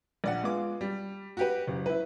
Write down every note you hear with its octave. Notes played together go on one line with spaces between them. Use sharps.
A#1 D5 F#5
G#3 B3 F4 D6
G3
F#4 G4 B4
F#1
E4 B4